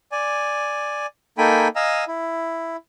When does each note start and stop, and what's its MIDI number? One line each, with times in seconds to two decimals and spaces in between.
0.12 1.06 74
0.12 1.06 80
1.38 1.68 58
1.38 1.68 63
1.38 1.68 69
1.38 1.68 79
1.38 1.68 80
1.38 1.68 83
1.76 2.04 75
1.76 2.04 77
1.76 2.04 80
1.76 2.04 82
1.76 2.04 88
2.08 2.76 64